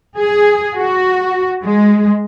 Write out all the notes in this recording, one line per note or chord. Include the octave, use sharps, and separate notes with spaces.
G#4
F#4
G#3